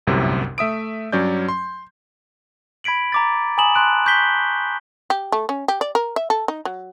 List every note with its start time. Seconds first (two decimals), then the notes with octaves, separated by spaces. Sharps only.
0.07 G1 C2 F#2 A2 C3
0.58 A3 E5 D#6 D7
1.12 G2 F#3 C#4 D5 G6
1.48 C6
2.84 B5 G#6 B6 D7 F#7
3.12 A#5 D6 A6
3.58 G#5 A#5 B5 D#6 E7 F#7
3.75 A5 C6 F#6 D7
4.06 C#6 G6 G#6 B6 G7
5.10 G4
5.32 A3
5.49 C#4
5.68 G4
5.81 D5
5.95 A#4
6.16 E5
6.30 A4
6.48 D#4
6.65 F#3